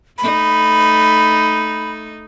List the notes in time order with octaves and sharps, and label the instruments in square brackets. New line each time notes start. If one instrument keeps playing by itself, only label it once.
[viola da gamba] A3 D#4 [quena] B5